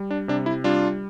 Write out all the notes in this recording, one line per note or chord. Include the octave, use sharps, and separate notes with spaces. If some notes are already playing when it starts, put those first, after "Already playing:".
Already playing: G3
D4
C3 D4
E4
G3 D4 F4